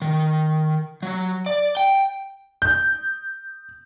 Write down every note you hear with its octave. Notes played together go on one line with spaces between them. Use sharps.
D#3
F#3
D5
G5
G6